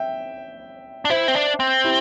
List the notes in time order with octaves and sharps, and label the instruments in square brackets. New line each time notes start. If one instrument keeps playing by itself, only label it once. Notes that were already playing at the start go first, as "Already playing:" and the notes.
Already playing: [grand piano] E5 G5
[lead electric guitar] D4
[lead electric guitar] E4 [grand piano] C5 E5
[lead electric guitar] C4
D4
C4
[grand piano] E4 G4